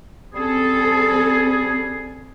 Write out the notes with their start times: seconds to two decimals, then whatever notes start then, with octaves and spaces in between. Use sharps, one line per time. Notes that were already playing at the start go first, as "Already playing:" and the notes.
0.34 G3 C4 C#4 G#4 A4